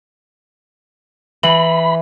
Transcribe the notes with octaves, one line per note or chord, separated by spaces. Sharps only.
E3 B5